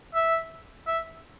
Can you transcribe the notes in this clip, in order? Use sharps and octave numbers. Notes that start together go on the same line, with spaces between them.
E5
E5